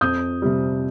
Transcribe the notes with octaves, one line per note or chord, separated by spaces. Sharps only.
F2 D#6 G6
C3 G3